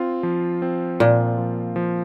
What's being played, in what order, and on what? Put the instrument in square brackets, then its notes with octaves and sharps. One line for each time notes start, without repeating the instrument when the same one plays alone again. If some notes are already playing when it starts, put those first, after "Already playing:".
Already playing: [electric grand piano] C4 F4
F3
C4
[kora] A#2 [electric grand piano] F3
[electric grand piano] F3
F3